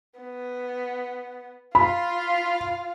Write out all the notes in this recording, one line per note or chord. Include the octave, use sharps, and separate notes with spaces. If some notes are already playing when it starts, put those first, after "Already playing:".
B3
F4 F5 B5